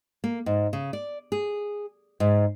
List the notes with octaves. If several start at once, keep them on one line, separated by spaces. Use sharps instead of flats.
A#3
G#2
C#3
D5
G#4
G#2